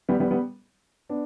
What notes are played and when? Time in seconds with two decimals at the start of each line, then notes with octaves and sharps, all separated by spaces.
0.09 G3 B3
0.20 G3 B3
0.31 G3 B3
1.09 B3 D4